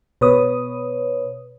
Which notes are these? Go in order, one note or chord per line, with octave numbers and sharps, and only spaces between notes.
B2 B4 C#5 D#6